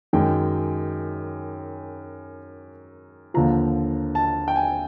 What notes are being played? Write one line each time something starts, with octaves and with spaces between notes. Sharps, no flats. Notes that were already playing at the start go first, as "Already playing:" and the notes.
F#2 D#3 G#3 G5
D#2 D3 F3 A#5
A5
G5
G#5